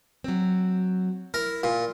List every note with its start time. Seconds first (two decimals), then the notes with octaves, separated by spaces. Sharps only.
0.24 F#3 C4
1.34 E4 A#4
1.63 A#2